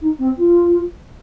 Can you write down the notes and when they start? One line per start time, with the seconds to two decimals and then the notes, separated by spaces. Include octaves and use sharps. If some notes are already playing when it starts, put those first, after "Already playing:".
0.02 D#4
0.19 C4
0.38 F4